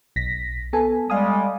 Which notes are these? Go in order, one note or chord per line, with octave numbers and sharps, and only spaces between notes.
B1 A#6 B6
B3 A4 G#5
G3 G#3 F5 G#5 D#6